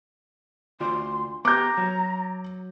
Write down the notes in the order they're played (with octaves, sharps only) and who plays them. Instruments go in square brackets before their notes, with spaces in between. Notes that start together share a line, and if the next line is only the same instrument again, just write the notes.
[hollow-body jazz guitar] D2 F4 D5 [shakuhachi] C6
[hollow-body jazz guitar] B3 G4 [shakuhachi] A#5 [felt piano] D6 G6
[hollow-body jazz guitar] F#3